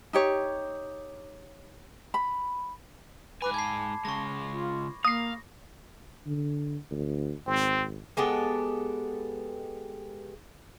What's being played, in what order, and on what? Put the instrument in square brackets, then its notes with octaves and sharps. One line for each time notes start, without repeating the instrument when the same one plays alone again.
[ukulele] D#4 G4 C#5
B5
[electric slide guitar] G#2 G#5 [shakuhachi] B4 [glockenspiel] B5 D6
[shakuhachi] A5 [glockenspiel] G#6 C7
[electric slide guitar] C#3 G#3 [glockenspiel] C#6 A#6
[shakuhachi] F4
[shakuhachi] A#3 [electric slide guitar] F5 [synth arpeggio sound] D#6 C7 [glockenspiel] A#6
[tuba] D3
D2
[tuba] G#1 [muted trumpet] C4
[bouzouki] G#3 B3 G4 A4